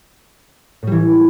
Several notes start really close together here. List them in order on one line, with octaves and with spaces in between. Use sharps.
A2 G3 E3